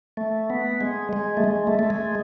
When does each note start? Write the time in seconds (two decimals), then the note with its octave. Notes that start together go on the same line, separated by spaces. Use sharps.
0.17 A3
0.50 B3
0.81 G#3
1.13 G#3
1.37 A3
1.44 G#3
1.67 A3
1.79 A3
1.90 G#3